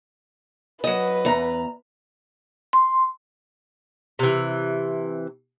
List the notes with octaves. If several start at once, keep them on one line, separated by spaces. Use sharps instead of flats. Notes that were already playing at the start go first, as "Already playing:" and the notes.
F#3 B4 D#5
E2 A#5
C6
C3 E3